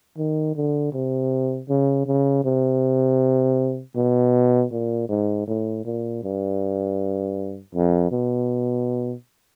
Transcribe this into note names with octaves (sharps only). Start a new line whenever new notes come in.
D#3
D3
C3
C#3
C#3
C3
B2
A#2
G#2
A2
A#2
G2
F2
B2